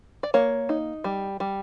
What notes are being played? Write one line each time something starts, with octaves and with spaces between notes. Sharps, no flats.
D5
A#3 C#5
D#4
G3
G3